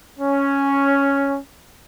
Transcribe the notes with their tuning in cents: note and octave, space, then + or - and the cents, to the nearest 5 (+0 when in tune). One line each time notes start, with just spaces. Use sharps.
C#4 +0